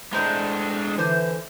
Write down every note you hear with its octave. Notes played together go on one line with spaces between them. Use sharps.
A2 G#3 D4 C5 A#5
D3 E3 C5